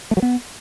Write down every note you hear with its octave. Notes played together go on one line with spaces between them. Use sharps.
A3
F#3
B3